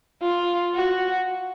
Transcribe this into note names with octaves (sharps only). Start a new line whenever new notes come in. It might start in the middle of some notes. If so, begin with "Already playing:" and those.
F4
F#4